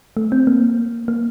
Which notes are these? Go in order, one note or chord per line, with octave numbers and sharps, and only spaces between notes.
A3
C4
A#3
A#3